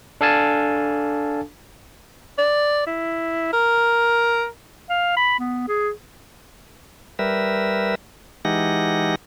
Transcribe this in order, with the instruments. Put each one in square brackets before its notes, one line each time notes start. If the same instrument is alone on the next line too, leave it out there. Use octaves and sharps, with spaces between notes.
[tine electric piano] D4 A4 F5 G#5 A5
[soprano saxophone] D5
E4
A#4
[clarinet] F5
B5
B3
G#4
[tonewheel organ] G3 A#4 B4 E5
E3 G#3 D#4 G4 F#5 A#6